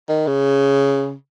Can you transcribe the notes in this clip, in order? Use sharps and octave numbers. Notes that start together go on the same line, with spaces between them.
D#3
C#3